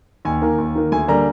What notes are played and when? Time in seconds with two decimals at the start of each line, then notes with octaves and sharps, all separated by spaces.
0.25 D#2 G#5
0.42 D#3 A#3
0.58 D#2
0.75 D#3 A#3
0.92 D2 G#5
1.08 D3 G3 A#3 A#5